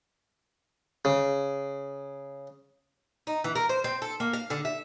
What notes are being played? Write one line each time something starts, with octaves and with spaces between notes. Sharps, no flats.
C#3
D#4
E3
A#4
C5
C4
A4
A#3
F5
D3
E5